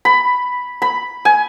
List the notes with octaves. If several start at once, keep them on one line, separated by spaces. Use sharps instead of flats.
B5
B5
G#5